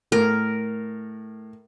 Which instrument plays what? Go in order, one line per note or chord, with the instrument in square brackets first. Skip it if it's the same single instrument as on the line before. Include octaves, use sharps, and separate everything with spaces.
[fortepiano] A2 [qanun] A#4